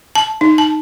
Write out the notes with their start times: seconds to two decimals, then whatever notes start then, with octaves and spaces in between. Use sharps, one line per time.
0.15 A5
0.41 D#4
0.58 A5